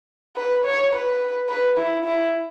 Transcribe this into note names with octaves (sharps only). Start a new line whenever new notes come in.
B4
C#5
B4
B4
E4
E4